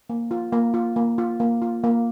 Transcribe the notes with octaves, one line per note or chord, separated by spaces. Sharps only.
A#3
F4
A#3
F4
A#3
F4
A#3
F4
A#3